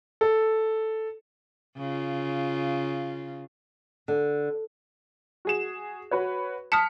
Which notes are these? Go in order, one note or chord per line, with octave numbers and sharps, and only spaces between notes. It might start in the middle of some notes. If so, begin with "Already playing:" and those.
A4
C#3 F4
D3
F#4 G#4 E7
F#4 B4 C#5
A5 D#6 F6 B6 C#7